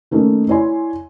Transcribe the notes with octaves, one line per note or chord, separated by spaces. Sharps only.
D#3 A3 A#3 C#4 D#4
E4 C#5 D5 G#5 C6